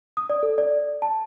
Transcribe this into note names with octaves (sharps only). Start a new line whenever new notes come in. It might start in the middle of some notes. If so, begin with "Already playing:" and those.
D#6
D5
A4
D5
A5